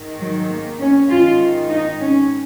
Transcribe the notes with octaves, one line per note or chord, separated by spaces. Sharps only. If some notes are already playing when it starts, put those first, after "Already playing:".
Already playing: G#2 D#3
F#3
A#3
C#4
G#2 D#3 F4
D#4
C#4